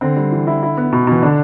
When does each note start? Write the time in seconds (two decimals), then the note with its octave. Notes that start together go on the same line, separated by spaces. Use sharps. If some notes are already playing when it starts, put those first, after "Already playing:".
0.01 D3 C4
0.16 G3
0.32 E3
0.47 E4
0.63 E4
0.77 B3
0.93 B2
1.07 B2 E3
1.22 D3 D4